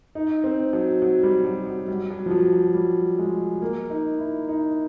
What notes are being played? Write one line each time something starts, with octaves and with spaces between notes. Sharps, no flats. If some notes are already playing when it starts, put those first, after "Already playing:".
D#4
C4
F#3
F#3
G3
F#3
F#3
G3
F#3
F3
F#3
F#3
G3
G#3
A#3
D#4
E4
D#4